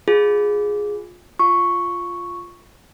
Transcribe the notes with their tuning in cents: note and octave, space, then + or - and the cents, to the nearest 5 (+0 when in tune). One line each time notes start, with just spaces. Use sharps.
F4 +25 G#4 +0
F4 +0 C#6 +0